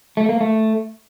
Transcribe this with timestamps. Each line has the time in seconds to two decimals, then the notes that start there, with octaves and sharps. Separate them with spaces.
0.17 A3
0.29 A#3
0.41 A3